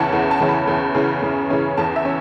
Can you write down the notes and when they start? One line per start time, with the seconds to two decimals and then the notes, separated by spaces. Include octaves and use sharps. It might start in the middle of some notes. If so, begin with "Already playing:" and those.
Already playing: E2 C#3 E3 C#4 F#5 A5
0.13 E2
0.31 A5
0.40 C#3 E3 C#4
0.49 B5
0.67 E2
0.95 C#3 E3 C#4
1.22 E2
1.50 C#3 E3 C#4
1.77 E2 A5
1.96 E5
2.05 C#4